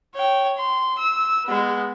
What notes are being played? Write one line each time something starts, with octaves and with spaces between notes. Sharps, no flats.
C#5 G5
C6
E6
G#3 B3